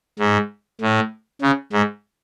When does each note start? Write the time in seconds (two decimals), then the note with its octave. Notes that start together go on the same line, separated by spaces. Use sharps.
0.19 G#2
0.81 A2
1.42 C#3
1.73 G#2